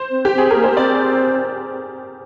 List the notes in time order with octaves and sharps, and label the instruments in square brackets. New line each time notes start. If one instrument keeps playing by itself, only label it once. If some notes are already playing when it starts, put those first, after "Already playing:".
Already playing: [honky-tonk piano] C5
[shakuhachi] C4
[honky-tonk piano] G4
[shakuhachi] C4
[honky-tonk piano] G#4
[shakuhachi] A#3 [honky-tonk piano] A#4
[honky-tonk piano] C5
[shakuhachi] A#3
[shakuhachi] C4 [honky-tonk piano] D5